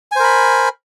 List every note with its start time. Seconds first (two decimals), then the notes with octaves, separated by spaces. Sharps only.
0.12 G#5
0.16 C5
0.20 A#4
0.24 B5